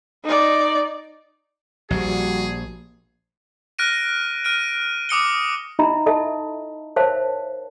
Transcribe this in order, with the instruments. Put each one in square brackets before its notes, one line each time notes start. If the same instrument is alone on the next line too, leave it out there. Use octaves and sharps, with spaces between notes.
[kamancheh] D#4 D5
[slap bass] A#1 [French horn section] G3 F#4 [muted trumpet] G#4
[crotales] F6 F#6 A#6 D7 D#7
F6 D7 D#7
D6 D#6 C#7 G7
[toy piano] D#4 E4 D#5 E5 A#5 B5
A4 D#5 E5 A5
A#4 C5 C#5 E5 F5 A5